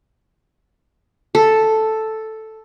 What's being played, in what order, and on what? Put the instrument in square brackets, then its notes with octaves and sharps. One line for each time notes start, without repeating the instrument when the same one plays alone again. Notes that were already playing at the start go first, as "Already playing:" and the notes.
[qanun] A4